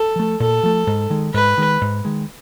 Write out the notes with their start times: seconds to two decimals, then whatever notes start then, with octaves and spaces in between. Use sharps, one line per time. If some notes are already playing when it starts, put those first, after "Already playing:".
Already playing: A4
0.16 F3 A3
0.40 A#2 A4
0.63 F3 A3
0.87 G#2
1.10 D#3 G#3
1.34 G#2 B4
1.57 D#3 G#3
1.81 G#2
2.05 D#3 G#3